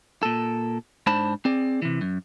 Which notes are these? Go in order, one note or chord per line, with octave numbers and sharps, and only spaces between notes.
A#2 A4
G#2 D4 C5 A5 B5
C4 G#4 D5
C3 E3
F#2